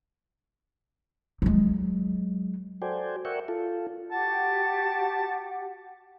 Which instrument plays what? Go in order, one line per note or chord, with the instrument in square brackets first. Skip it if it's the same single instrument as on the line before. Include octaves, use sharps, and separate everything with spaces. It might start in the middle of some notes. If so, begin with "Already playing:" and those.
[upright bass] F#3 G#3
[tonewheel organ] F#4 A4 C5 D5 G5 G#5
A#4 D5 E5 F#5 G5 C#6
F4 A4
[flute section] F#4 G4 F#5 [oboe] A5